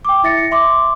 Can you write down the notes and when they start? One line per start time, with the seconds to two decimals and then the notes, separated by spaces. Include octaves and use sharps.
0.05 G5 D6
0.24 E4 E5 A6 A#6 C#7
0.51 E5 C6 D6